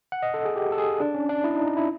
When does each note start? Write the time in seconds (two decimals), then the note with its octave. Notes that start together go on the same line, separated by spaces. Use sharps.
0.12 F#5
0.23 D#5
0.34 A4
0.45 G#4
0.56 G4
0.72 A4
0.78 G#4
1.00 D4
1.15 C#4
1.29 D4
1.44 E4
1.55 D#4
1.66 D#4
1.77 E4